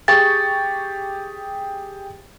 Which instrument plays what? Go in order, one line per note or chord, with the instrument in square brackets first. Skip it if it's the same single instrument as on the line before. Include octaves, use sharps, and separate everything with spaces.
[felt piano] G4 G#4 C#6 [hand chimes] A6